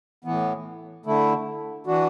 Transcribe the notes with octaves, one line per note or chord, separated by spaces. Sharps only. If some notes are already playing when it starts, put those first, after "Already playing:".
A2 E3 B3
D3 A3 E4
E3 D4 F#4